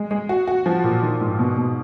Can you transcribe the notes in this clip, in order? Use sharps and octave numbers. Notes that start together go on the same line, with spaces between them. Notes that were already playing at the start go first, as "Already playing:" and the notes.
Already playing: G#3
G#3
F#4
F#4
F3
A#2
D#3
G#2
B2
B2